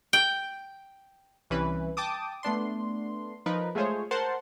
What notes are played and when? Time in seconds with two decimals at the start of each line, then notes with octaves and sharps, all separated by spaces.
0.13 G5
1.50 C2 E3 C#4 B4
1.97 G5 A5 D6 D#6
2.43 A3 B3 D4 C6
3.46 F3 D#4 A#4 B4
3.75 G#3 A3 F4 G#4 C5 C#5
4.11 A#4 C5 F#5 A5 C6